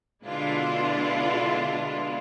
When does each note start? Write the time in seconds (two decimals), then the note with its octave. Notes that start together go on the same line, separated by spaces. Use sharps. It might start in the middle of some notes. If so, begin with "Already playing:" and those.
0.24 B2 D3 G#3 D4 E4 F4